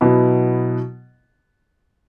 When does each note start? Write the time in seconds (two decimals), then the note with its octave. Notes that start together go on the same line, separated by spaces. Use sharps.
0.01 B2 F#3 B3 E4